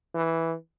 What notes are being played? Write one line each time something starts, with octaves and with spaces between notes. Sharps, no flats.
E3